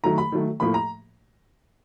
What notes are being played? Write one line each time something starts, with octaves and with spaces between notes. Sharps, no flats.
D#3 F#3 A3 A#5
B5
D#3 F#3 A3
A2 F3 A#3 B5
A#5